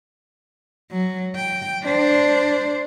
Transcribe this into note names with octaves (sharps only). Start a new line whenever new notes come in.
F#3
G5
D4 C5